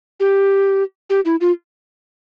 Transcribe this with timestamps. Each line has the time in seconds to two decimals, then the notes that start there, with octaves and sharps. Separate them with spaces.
0.20 G4
1.10 G4
1.25 E4
1.41 F4